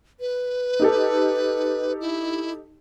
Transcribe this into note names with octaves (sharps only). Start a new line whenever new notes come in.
B4
D#4 G4 A4
E4